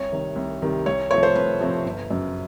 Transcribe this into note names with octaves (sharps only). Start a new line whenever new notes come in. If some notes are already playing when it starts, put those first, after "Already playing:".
Already playing: C2 C#5
C3 D#3 G3
C2
C3 D#3 G3
C2 C#5
C3 F3 A3 C4 C#5
C5
C2 B4
C3 F3 A3 C4
G1
F#2 C#3